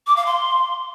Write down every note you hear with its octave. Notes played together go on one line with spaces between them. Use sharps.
D6
F5
C6